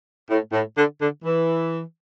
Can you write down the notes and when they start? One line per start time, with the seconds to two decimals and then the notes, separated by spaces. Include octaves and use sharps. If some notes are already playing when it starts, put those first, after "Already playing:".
0.29 A2
0.52 A2
0.76 D3
0.99 D3
1.23 E3